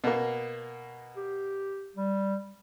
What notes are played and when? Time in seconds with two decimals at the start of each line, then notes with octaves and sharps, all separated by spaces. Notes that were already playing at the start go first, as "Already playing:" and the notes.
0.04 B2 A#3
1.16 G4
1.96 G3